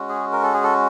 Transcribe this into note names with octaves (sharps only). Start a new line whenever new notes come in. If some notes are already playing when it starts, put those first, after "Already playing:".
Already playing: G#3 C#4 F#4
G#4
A#4
A4
G#4
A4